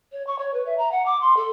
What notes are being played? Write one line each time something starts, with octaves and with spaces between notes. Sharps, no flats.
C#5
C#6
C#5
B4
E5
A#5
F#5
D6
C6
A4